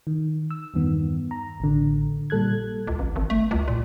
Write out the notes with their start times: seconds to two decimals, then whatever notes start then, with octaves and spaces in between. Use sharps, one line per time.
0.07 D#3
0.51 E6
0.74 E2 G2 D#3 B3
1.31 A#5
1.60 A1 D3
2.30 A#2 G3 A4 F#6 G#6
2.87 C#2
2.99 A1
3.16 G#1
3.30 A3
3.51 C#2
3.68 A#2